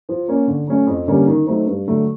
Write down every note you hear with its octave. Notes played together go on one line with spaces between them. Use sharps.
F3
A#3 C#4
D3
F#3 A3 C#4
F2
D3 G3 A#3 C#4
D#3
F#3 A3 C4 D#4
G2
D3 F#3 A3